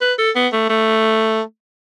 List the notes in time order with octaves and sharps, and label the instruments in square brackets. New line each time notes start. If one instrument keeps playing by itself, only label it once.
[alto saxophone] B4
A4
B3
A3
A3